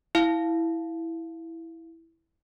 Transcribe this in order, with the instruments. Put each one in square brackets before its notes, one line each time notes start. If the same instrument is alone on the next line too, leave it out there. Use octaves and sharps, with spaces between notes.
[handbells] E4 F5